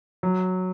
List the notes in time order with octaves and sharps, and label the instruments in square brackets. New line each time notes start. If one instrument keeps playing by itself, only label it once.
[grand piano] F#3